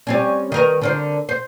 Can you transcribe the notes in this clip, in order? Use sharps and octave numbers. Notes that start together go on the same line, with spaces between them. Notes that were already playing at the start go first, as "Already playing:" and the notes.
G3 C4 C#4
D#3 A#4 B4
D3 A#4 C5
C5